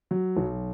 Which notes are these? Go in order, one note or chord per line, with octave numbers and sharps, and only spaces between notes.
F#3
B1